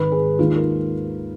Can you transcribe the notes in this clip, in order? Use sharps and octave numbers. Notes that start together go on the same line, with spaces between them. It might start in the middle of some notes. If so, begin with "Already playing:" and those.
Already playing: G#1 G#2 D#3 G#3 B4
G#4
D#2 D#3 G#3 D#4 F4
A#4